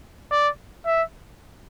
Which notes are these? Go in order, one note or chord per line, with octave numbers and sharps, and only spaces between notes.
D5
E5